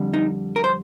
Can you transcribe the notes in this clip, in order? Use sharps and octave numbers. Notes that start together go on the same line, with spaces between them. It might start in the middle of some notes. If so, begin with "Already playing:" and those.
Already playing: F2 D3 G3
D#4
A#4
C5